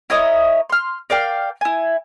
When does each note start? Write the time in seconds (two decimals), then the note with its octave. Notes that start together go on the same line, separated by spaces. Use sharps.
0.10 E4 A#4 C#5 D#5
0.70 C6 F6
1.10 A#4 D5 F5 G5
1.61 E4 G#5